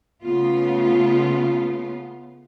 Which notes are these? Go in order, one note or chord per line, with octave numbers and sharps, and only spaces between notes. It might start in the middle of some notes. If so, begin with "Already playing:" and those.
C#3 A3 B3 F4